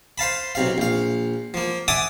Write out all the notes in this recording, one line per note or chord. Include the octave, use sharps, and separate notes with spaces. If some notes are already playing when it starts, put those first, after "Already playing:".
C5 F5 A5 B5
B1 C3 F5
A#1 F5
F3 A#3
E5 F#5 G#5 A5 D6 D#6